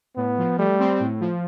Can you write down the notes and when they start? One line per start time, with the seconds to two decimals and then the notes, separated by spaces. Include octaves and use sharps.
0.17 A2 B3
0.38 F3
0.58 G3 A3
0.79 C4
1.00 A2
1.20 F3